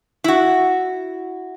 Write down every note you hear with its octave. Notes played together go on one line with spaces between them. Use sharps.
E4 F#4